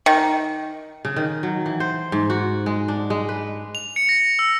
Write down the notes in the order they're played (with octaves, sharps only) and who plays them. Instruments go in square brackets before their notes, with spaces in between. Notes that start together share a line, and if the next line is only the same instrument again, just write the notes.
[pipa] D#3
[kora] C#3
D#3
F#3
E3
C5
G#2
F#4
G#3
D4
G#3
B4
[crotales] F7
C#7
A#6
E6